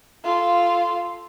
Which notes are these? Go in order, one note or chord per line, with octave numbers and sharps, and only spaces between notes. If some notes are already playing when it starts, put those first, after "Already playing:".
F4 A4